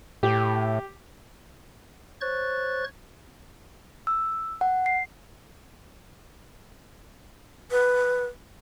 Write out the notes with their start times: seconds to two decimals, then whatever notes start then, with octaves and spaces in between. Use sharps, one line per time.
0.23 A2 G4
2.21 C5 C#5 C#6 F#6 A6
4.07 E6
4.61 F#5
4.86 C7
7.71 B4